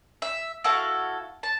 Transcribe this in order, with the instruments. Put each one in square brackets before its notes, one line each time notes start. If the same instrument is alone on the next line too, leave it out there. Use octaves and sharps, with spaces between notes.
[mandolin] E5
E4 F#4 A4 F5
A5